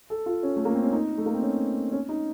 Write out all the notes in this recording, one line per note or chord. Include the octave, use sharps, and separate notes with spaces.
A4
F4
C#4
A3
A#3
C4
C#4
D#4
A3
A#3
C4
C#4
C#4
D#4